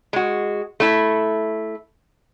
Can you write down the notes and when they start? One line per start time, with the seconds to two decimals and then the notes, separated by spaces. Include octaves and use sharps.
0.13 G#3 F#4
0.80 A3 E4